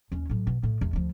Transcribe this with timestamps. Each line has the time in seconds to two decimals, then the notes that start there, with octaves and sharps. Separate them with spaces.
0.12 D#2 C#4
0.29 A2 F#3
0.47 B2
0.63 A2
0.81 E2
0.93 D2 F3